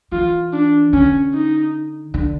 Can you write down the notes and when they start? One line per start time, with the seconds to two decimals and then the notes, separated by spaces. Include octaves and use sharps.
0.12 E3 F4
0.53 D4
0.93 D3 C#4
1.34 D#4
2.14 D3